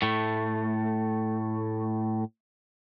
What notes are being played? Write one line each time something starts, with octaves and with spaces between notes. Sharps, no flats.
A2 A3